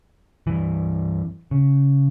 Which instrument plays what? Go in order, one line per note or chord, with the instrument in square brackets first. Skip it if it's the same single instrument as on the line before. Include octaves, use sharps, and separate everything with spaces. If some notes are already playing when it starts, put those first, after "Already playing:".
[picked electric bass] G2 E3
C#3